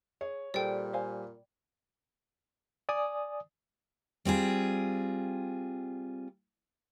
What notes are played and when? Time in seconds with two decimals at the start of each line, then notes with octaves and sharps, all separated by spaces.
0.21 G#4 C#5
0.54 A#2 G3 G#4 A4 C5 D5 G5
0.93 C5 F5 G#5
2.89 D5 G#5 D#6
4.25 G3 C4 F4 G#4